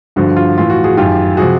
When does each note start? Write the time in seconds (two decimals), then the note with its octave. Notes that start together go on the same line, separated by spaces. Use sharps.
0.16 G2 D3 F3 F#4
0.36 F4
0.57 A2 E3 F4
0.70 F#4
0.84 F#4 G#4
0.97 F#2 D#3 F4 G4
1.37 C3 F3 F#4 G#4